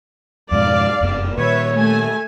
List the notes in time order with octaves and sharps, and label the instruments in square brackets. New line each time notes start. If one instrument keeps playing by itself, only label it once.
[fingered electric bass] F2 G#2 B2 [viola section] D5 F5
[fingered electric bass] F1 F#2 B3
[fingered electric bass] A#2 D#3 [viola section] B4 C#5 E5
[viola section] A3 G#5